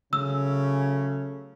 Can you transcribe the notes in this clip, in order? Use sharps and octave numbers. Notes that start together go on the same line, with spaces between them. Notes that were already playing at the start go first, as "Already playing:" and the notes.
C#3 F#3 A3 C#4 E6